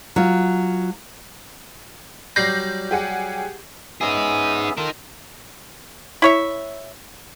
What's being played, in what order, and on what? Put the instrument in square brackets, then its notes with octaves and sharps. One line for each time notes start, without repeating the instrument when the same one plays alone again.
[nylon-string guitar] F#3 F4
[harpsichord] F#3 G3 D5 [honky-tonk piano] G6 A#6 C7
[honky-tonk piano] G4 G#4 F#5
[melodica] B3 C#4 E5 [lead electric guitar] D#4 G#4
[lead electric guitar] D#4 A#4 [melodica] F4 A4
[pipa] E4 C#5 E5